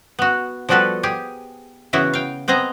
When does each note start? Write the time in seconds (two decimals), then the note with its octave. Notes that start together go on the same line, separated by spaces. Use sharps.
0.19 B3 F#4
0.69 F3 G3 B3 F#4 A4 B4
1.03 G4 G#4
1.93 C#3 E3 B3 E4 F#4
2.14 F5 G5
2.48 B3 C4 G#4 D#5 A#5